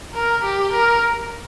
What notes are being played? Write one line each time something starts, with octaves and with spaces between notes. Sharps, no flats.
A#4
G4
A#4